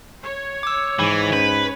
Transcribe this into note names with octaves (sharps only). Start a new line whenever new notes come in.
C#5
D6 E6
G#2 E3
C#4 B4